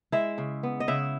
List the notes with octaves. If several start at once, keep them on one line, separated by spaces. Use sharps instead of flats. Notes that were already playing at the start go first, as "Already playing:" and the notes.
G#3 E4 E5
C#3
B3
D#5
C#3 E4 E5